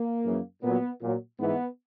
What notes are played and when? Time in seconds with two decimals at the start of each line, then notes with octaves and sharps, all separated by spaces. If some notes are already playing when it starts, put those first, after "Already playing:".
Already playing: A#3
0.24 F#2 C#3 E3
0.62 A#2 F#3 B3
1.01 A#2 F#3
1.39 G#2 E3 B3